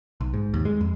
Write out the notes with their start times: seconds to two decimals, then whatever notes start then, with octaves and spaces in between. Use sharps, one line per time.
0.21 B1
0.34 G#2
0.54 D#2
0.65 G#3
0.81 F2